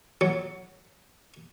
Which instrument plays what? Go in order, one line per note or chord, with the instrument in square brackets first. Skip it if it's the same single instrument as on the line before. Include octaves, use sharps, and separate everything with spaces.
[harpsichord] F#3